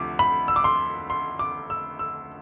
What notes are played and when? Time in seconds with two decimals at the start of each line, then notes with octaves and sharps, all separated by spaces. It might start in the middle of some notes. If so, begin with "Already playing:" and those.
Already playing: D2 C3 F3 D6
0.19 B5
0.48 E6
0.56 D6
0.64 C6
1.10 C6
1.39 D6
1.70 E6
1.99 E6